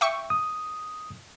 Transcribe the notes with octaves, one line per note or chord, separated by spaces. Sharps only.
E5 G5 C#6
D#6